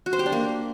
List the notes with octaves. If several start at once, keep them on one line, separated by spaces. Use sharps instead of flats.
F#4
C5
G4
D4
A#3